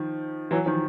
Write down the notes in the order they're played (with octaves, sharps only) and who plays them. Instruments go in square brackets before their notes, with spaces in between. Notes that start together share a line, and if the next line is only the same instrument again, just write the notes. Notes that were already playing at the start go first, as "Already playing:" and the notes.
Already playing: [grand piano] D#3 F3
E3 F#3
D#3 F3